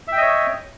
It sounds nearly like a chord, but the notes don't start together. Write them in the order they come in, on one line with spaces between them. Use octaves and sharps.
E5 G5 D#5 C#5